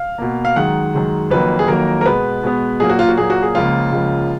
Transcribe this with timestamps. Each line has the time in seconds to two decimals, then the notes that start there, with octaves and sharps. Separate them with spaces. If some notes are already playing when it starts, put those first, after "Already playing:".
Already playing: F5
0.18 B2 A#3
0.45 F5
0.56 F#2 D#3 G#3 F#5
0.93 F#2 D#3 G#3
1.31 F2 D#3 F#3 A#3 B4
1.59 G#4
1.68 F2 D#3 F#3 A#3 A#4
2.01 A#4
2.05 B2 G#3 B3 B4
2.43 B2 G#3 B3
2.80 A#2 F#3 A#3 G#4
2.89 F#4
2.99 F4
3.09 F#4
3.17 A#2 F#3 A#3 G#4
3.30 F#4
3.42 G#4
3.55 C#2 C#3 F3 A#3 F4
3.93 C#2 C#3 F3 A#3